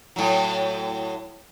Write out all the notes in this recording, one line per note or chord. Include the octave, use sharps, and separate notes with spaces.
A2 F#3